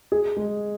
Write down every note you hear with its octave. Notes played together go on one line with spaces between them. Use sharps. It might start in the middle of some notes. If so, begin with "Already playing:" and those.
G#4
G#3